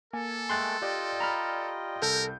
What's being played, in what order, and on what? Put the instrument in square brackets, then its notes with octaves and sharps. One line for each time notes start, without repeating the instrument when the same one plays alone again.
[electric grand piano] A#3 G#5 [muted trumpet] A4
[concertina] G#3 A3 G5 [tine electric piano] C6 F#6 A6
[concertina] F4 D#5 G5 [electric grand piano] G4 D5
[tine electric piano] A#5 B5 F6
[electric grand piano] C2 G6 [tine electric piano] A4 [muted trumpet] A#4